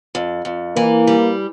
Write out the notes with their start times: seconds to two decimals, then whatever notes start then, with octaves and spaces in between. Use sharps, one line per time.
0.15 F2
0.45 F2
0.76 E3 A#3
1.07 G3